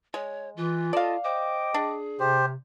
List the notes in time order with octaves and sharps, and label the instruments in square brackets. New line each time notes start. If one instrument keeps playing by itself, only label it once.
[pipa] G#3 [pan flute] C#5
[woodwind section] E3 [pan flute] F4
[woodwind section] A4 D#5 A5 [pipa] D5 F5
[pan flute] C5 [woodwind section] D#5 G5 D6
[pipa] D4 [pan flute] G#4
[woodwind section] C3 [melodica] G4 C5